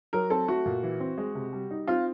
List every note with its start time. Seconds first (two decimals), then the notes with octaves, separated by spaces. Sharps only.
0.13 F#3 A#4
0.30 C4 A4
0.48 A3 F#4
0.66 A#2
0.83 E3
1.00 C4
1.18 G#3
1.35 C3
1.53 G3
1.71 D#4
1.88 C4 F4